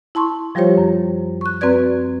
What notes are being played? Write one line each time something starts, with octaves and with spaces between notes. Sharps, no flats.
E4 A5 C6 C#6
F3 G3 F4 G4 C5 C#5
F#2
C#6 F#6
F#2 C4 F#4 B4 D5 G#6